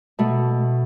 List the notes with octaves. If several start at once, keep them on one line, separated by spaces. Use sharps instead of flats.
B2 A3